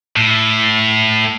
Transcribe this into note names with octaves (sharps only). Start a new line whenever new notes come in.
A2